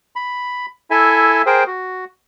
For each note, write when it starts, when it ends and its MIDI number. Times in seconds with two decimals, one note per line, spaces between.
0.16 0.66 83
0.91 1.42 64
0.91 1.42 69
0.91 1.42 76
0.91 1.42 80
1.46 1.64 68
1.46 1.64 70
1.46 1.64 72
1.46 1.64 79
1.67 2.05 66